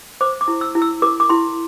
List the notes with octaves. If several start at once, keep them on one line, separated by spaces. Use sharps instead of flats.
C5 D6
D6
E4
E6
E4
E6
A#4 D6
D6
E4 C6